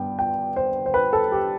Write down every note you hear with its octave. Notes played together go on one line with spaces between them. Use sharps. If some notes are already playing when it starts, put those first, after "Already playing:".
Already playing: G2 B3 G5
G5
C5
C5
B4
A4
G4